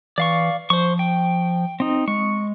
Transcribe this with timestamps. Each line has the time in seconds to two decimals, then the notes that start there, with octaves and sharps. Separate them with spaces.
0.18 E3 D5 F5 C#6
0.70 F3 C5 C#6
0.99 G5
1.80 C4 D#4
2.08 G#3 C#6